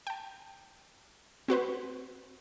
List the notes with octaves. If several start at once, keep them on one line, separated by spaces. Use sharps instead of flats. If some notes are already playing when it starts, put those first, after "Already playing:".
G5 A5
C4 F#4 B4 C5